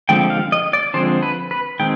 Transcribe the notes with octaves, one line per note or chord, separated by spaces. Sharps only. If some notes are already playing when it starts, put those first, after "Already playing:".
D3 F3 G#3 C4 G5
F5
D#5
D5
D3 F3 G#3 C4 C5
B4
B4
D#3 G#3 C4 G5